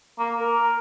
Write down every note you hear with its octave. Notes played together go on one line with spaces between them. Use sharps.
A#3
A#4